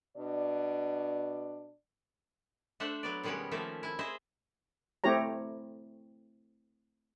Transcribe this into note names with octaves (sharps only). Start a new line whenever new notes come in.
B2 D4 D5
A3 D4 C5 E5 F#5
F#3 B3 D5
B2 D#3 G3 G#3 B3 C#4
D#3 F3 A3 A#3 E5
E4 G#5
G#4 C5 D#5 E5
A3 C4 E4 G4 C#5 A#5